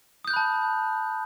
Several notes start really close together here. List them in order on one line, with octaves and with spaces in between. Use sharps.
D#6 G6 F#6 B5 A5